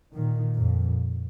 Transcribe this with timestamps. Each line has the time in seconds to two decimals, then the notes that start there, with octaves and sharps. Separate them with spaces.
0.14 A#2 D#3
0.56 F2 A#2